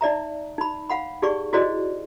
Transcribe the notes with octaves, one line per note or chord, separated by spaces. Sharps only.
D#4 D5 E5 A#5
D#4 B5
F5 F#5 B5
D#4 G4 G#4 D5 C#6
E4 F#4 G#4 C5 D5 D#5